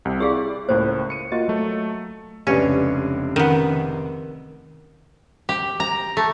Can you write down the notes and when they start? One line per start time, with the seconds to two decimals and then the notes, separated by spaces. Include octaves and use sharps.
0.05 C2 C3
0.20 E4 G4 G#4 D5 F5
0.69 C#2 A2 A#3 C5
1.10 C#7 D#7
1.32 A#3 F4 F#4 D#5
1.48 F#3 A3
2.47 F1 C#2 C#4 D4 G4 B4 D5
3.36 D#3 B3 C#4 F#5
5.49 G4
5.80 A#5
6.17 A3